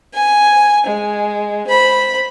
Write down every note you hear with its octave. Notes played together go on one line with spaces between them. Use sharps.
G#5
G#3
C5 B5